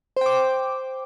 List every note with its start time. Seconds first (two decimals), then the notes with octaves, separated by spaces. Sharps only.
0.17 C5
0.21 G5
0.26 D6